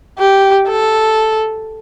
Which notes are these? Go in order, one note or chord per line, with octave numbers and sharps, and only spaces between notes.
G4
A4